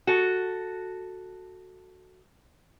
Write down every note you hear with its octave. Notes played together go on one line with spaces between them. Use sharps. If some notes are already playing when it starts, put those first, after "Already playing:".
F#4 A4